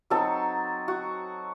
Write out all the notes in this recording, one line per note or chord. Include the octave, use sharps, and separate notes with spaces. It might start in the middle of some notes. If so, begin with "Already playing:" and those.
F#3 C4 D#4 A4
F#4